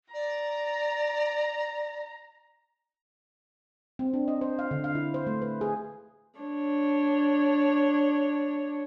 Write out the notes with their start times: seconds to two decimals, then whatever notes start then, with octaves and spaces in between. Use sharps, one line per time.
0.14 D5 A#5
3.99 C4
4.14 D4
4.28 D#5
4.41 C5
4.59 F5
4.71 D3
4.84 F5
4.95 E4
5.14 C5
5.27 A3
5.42 B4
5.61 G#4
6.40 D4 C#5